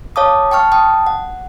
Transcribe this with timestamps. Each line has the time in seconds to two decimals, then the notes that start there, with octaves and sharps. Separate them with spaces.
0.16 C#5 F5 A5 D6 D#6
0.51 G5 A5 C#6 F6
0.72 G5 A5 D#6
1.07 F#5